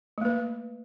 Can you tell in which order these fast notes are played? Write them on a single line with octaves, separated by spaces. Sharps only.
A3 A#3 B4